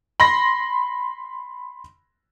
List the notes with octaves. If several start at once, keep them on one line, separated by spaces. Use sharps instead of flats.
B5 C6 A#6